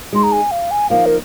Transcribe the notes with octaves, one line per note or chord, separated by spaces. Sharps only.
G#3 D#4 G#4 C6
A#5
G#5
F5
G#5
F3 A#3 D#4 F5
A#4